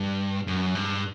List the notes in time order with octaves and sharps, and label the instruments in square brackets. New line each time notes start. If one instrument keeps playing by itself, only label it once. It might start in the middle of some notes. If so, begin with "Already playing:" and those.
Already playing: [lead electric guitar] G2
F#2
G2